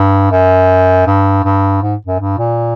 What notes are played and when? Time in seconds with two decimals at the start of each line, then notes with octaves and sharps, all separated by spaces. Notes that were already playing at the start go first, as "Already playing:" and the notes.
Already playing: G2
0.31 F#2
1.06 G2
1.44 G2
1.82 G#2
2.07 F#2
2.20 G2
2.38 A#2